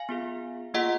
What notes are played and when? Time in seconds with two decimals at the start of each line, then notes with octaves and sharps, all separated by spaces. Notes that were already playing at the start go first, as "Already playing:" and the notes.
Already playing: F5 G#5
0.09 B3 F4 G#4
0.74 A#3 F4 G#4 D#5 F#5